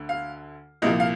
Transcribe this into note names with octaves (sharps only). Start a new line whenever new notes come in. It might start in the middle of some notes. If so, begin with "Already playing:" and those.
Already playing: D2 D3
F5
C2 A#2 F3 D#5
F5